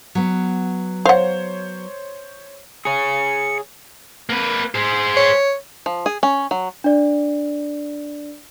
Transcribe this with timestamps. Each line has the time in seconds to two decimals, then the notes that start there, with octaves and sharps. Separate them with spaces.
0.15 F#3 B3
1.05 C5 C#5 F5 F#5
2.85 G#4 C#5 C#7
4.30 A#3 B4
4.75 G#4 C5
5.17 C#5
5.86 F3
6.06 G#4
6.23 C#4
6.51 F#3
6.84 D4 D5